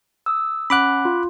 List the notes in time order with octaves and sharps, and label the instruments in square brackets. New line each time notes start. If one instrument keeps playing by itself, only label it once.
[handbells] D#6 E6
[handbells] C#4 F#5 [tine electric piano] B5 D6 F#6
[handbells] F4